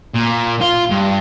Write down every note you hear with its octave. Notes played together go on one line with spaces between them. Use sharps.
A#2
F4
G2